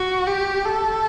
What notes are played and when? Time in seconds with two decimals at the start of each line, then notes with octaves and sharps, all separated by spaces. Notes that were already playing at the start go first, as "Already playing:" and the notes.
Already playing: F#4
0.27 G4
0.65 A4